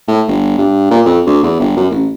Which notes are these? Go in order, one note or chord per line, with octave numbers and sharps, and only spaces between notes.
A2
G1
G2
A#2
F2
D2
E2
G1
F#2
A1